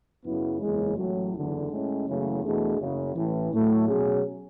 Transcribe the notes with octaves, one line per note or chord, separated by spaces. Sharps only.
F#2 C#3 F#3 B3 E4
F#1 E2 C#3 G#3
A1 A2 F#3
F#1 E2 D3
A2 G#3 C#4
F#1 E2 C#3 F#3 A3
E2 B2 A3 D4 G#4
F#1 F#2 C#3
A1 A2 E3
A2 F#3 A3
B2 F#3 C#4 G#4